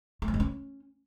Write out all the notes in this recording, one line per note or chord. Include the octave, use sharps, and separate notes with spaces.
A3
F3
G#3
C#4